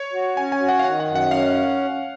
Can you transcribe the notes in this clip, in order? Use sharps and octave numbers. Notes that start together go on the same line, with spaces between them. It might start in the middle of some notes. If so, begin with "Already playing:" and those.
Already playing: C#5
F#4
C#4 G#5
G#5
F#4
F#5
F5
D#3 F#5
F#5
F#2
F#5
C#4 F5